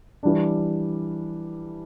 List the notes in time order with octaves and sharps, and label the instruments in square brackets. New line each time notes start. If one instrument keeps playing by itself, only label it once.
[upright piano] E3 G3 D4